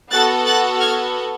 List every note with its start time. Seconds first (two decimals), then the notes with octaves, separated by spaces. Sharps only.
0.11 B3 F#4 A4 F#6 A6
0.45 F#6 A6
0.80 F6 G#6